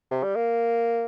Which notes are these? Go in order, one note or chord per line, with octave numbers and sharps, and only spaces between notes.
C3
G3
A#3